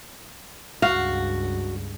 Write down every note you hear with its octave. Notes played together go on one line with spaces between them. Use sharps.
C#2 G2 F#4 F5